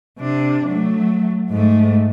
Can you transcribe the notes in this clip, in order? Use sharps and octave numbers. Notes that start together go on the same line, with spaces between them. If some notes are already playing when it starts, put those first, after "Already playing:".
C3 D4
F#3 A3
G#2 A3